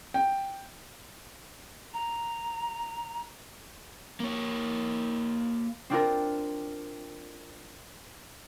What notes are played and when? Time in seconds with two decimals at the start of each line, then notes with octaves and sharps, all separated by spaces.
0.14 G5
1.94 A#5
4.20 A#3 C#5
5.90 C4 D4 F4 A#4